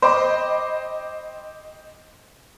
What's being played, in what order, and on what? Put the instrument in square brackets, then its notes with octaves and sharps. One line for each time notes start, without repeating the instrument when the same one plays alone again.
[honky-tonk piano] C5 D#5 G5 B5 D6